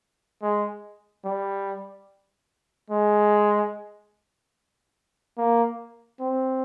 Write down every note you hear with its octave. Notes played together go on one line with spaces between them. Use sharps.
G#3
G3
G#3
A#3
C4